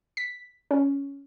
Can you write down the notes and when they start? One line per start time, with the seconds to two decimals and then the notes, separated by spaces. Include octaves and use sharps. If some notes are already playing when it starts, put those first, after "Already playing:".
0.17 B6
0.71 C#4